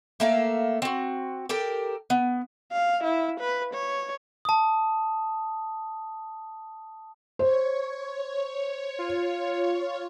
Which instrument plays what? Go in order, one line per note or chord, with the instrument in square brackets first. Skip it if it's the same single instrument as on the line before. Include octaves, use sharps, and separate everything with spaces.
[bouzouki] A3 A#3 E5 F5
C4 F#4
G4 A4 A#4 G5
B3
[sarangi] F5
E4
B4
C#5
[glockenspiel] A5 D#6
[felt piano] C5 [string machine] C#5
[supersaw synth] F4